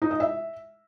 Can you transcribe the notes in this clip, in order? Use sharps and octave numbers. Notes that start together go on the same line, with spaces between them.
D#4
D#5
E5